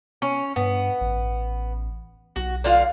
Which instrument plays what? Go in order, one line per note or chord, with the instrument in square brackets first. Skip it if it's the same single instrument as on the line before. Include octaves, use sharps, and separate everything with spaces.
[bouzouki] C#4
[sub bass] G2 [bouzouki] B3
[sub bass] A1
[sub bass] B1 [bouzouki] F#4
[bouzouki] D3 F4 F5